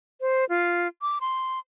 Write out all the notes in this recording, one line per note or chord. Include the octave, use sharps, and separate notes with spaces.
C5
F4
D6
C6